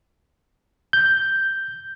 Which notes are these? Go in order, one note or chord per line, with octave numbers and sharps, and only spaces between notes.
G6